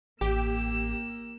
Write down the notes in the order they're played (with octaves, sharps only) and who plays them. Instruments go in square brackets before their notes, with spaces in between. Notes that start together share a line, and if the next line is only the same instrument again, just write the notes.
[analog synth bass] A1 [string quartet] A#3 E6 [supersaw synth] G4